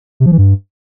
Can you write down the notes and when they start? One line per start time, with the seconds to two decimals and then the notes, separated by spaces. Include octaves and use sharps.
0.20 C3
0.26 F3
0.32 E3
0.38 G2